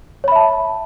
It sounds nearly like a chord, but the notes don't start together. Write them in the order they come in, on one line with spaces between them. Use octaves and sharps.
C#5 B5 E5 A5